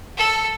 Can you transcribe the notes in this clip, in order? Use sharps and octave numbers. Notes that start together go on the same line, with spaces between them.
A4